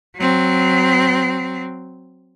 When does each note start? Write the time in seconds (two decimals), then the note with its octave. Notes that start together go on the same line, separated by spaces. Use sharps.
0.17 F#3 C4